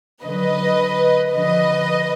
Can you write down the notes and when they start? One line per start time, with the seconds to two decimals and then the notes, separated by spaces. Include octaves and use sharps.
0.24 D3 F#3 B4 D#5
1.31 D3 F3 B4 D#5